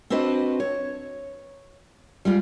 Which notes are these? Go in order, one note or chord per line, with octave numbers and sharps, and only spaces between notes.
C4 D4 F#4 B4 C5 D#5
C#5
G3 G#3 F4